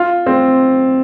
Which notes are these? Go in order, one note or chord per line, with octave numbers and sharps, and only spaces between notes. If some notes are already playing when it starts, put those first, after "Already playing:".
Already playing: F4
C4